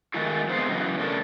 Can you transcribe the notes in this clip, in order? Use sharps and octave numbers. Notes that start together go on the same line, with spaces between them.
D#3 G#3 A3 F4 F#4
F2 G#3 B3 D#4 C5 F5
C#3 E3 F#3
C#3 A3 C#4 A#4 D5 A5